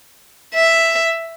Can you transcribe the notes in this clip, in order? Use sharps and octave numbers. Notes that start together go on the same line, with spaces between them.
E5